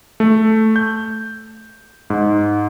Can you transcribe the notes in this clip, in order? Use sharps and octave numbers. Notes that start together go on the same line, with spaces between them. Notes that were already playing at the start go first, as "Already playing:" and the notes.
A3
G6
G#2